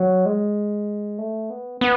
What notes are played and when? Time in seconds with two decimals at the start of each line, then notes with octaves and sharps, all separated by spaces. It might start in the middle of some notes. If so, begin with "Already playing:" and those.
Already playing: F#3
0.26 G#3
1.18 A3
1.50 B3
1.81 B3